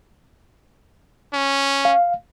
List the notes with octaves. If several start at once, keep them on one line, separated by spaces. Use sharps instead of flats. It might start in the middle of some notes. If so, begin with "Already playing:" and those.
C#4
F5